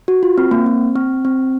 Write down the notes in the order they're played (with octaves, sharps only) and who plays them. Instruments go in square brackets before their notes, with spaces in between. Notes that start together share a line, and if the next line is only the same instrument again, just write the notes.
[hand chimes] F#4
F4
C4
A#3
C4
C4
C4